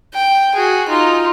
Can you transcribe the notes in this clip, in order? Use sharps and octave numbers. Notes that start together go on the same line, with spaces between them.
G5
F#4 G#4
D#4 F4